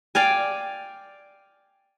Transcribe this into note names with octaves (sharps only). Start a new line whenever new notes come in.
D5 F5 G5 G#5